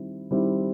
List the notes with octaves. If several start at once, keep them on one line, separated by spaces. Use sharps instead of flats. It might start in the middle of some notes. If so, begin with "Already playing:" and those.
Already playing: D#3 G3 C4 E4
D#3 G3 C4 E4